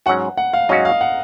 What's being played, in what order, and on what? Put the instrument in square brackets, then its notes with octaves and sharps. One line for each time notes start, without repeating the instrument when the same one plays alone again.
[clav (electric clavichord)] G#2 F#3 C#4 F#4 [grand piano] F#5
[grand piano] F#5
F5
[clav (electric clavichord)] G#2 F#3 C#4 F#4 [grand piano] D#5
[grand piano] F5
F#5